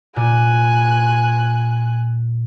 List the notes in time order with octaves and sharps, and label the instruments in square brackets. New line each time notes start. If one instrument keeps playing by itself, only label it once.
[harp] A#2 [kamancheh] G#5 F#6